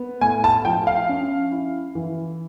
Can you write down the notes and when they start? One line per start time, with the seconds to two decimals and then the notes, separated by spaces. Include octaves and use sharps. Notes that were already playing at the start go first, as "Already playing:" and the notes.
Already playing: B3
0.21 A2 G#5
0.44 A5
0.65 F3 G5
0.87 F5
1.09 C#4
1.51 E4
1.95 E3